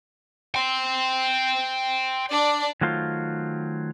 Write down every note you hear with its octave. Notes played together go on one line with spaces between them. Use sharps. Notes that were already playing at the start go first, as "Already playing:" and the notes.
G5 C6
D4 D5
D#3 F#3 A3 F4 C5